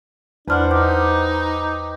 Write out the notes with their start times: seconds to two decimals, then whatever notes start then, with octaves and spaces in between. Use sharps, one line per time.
0.48 E2 D4 B4 C5 F#5 F6
0.71 D#4 G4